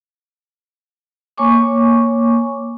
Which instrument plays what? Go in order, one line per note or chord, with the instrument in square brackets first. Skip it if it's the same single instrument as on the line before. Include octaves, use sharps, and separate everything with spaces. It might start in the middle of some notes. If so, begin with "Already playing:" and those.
[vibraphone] A#3 C#5 G#5 C#6 D6